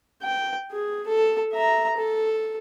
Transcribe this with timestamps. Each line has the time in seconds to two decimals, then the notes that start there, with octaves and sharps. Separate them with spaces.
0.22 G5
0.72 G#4
1.07 A4
1.53 E5 A#5
1.97 A4